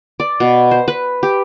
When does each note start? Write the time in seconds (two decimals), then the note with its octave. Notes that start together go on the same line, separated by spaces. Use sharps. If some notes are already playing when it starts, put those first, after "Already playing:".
0.20 D5
0.40 B2
0.71 C5
0.88 B4
1.23 G4